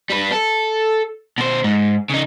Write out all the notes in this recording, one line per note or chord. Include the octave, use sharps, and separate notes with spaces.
G3 B4
A4
B2 C5
G#2
C#3 D#4